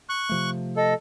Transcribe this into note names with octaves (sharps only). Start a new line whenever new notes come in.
C#6 F#6
C3 F3 A3
A4 D#5